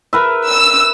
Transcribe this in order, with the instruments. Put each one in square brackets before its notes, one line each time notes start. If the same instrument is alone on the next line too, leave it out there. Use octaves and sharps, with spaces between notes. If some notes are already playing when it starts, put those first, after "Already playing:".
[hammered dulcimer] A#4 B4 E5
[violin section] E6